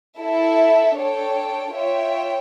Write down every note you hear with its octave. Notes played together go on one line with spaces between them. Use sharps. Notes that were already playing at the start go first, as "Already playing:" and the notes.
E4 A4 E5
D4 A4 C#5 G5
F4 C#5 E5 G5